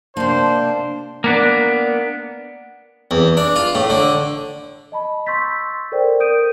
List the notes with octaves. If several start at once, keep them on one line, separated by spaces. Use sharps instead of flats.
C3 A#3 D4 C5 A5
A#3 B3 D4
E2
D4
F4
A2
D3
D#5 A5 B5
C6 C#6 E6 G6 A6 B6
A4 A#4 C5 D5 G5
A#4 D#6 G6 D7 D#7